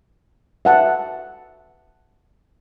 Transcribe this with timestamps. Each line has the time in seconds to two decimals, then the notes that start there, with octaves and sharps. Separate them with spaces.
0.65 E5 F#5 A5